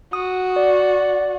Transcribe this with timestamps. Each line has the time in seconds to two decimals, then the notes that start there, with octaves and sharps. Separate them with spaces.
0.13 F#4 D#6
0.56 D5